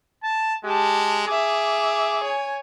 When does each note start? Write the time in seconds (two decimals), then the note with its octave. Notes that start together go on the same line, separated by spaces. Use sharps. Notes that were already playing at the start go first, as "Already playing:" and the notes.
0.23 A5
0.65 G#3 G4 A5
1.27 G#4 E5 D6
2.24 C#5 G#5